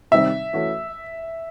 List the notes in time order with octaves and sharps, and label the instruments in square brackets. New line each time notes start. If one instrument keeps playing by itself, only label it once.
[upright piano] C3 D#3 G3 C4 D#4 [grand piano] E5
[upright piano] E3 A3 C#4 F#4